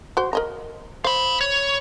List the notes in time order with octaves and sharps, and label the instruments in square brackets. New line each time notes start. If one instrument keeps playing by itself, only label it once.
[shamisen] F#4 C5
A#4 D#5 A#5
[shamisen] C5 [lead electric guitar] F5 B5
[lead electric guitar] C#5